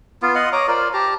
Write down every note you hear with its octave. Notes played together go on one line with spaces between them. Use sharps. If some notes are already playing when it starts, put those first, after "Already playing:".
B3 F4
D#5 F5 F#5 C6
C#5 A#5 D6 D#6
F4 A#4 C5 D5
G4 A5 A#5